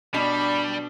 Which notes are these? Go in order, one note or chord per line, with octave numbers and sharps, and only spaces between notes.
B2 G3 D4 B5